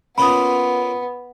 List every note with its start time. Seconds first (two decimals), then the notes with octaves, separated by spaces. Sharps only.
0.18 A#3 B3 C#4 F4 B5 D#6